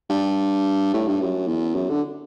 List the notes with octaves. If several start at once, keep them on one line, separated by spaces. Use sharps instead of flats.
G2
A2
G2
F#2
E2
F#2
D3